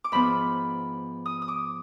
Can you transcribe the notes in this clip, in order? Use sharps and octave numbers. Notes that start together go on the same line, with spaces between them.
D6
G#2 F3 B3 B5
D#6
D#6
D6